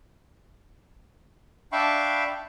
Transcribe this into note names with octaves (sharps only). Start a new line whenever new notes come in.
D4 E5 F5 G5 B5 C#6